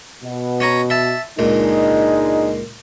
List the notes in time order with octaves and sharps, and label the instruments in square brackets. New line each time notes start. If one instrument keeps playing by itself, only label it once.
[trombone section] B2
[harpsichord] C#4 C#5 A#5
E5 A5
[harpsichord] C#2 A#2 [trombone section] G#3 D4 D#4